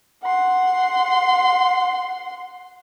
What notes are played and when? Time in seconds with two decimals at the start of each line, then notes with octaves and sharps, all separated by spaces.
0.23 F#5 C6